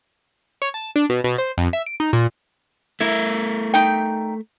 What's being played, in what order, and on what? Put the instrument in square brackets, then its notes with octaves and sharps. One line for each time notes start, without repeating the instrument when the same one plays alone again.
[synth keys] C#5
A5
D4
B2
B2
C5
F2
E5
D7
D#4
A#2
[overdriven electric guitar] A3 A#4 [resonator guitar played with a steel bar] E4
[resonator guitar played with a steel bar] D#4 G5